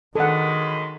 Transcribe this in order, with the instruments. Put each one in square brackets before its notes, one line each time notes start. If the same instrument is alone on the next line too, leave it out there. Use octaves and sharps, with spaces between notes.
[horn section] F#2 G#3 B5 [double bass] D#3 [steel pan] A4 F#5